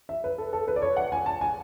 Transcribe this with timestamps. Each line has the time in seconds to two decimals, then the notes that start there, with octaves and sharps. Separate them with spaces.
0.09 E5
0.24 B4
0.38 A4
0.53 A4
0.68 B4
0.76 D5
0.82 C#5
0.97 F#5
1.12 G#5
1.26 A5
1.41 G#5